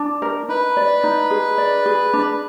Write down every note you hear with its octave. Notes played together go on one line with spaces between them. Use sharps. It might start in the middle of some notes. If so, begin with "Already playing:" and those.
Already playing: D4
A#4
D#4 B4
D5
D#4
G#4
D5
G#4
D4